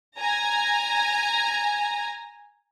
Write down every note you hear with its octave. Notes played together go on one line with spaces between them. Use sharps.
G#5 A#5